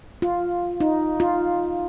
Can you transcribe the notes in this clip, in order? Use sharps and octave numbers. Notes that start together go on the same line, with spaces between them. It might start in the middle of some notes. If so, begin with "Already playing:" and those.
F4
D#4
F4